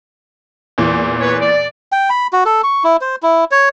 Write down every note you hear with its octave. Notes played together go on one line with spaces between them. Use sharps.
E2 A#2 E3
B4 C#5
D5
G5
B5
F#4
A4
C#6
E4
C5
E4
C#5